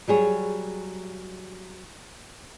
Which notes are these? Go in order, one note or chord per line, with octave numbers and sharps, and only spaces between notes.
F#3 G3 G#4 C#5